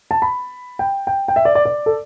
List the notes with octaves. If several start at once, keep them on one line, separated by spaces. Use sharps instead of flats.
A5
B5
G5
G5
G5
E5
D5
D5
D5
A4